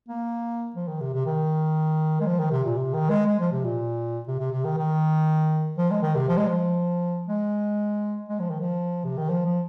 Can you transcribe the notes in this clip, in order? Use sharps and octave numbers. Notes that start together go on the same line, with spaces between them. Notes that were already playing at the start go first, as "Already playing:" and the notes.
A#3
F3
D#3
C3
C3
D#3
G#3
F3
D#3
C3
A#2
C3
D#3
G#3
G#3
F3
C3
A#2
C3
C3
C3
D#3
D#3
F3
G#3
D#3
C3
F3
G#3
F3
G#3
G#3
F3
D#3
F3
C3
D#3
F3
F3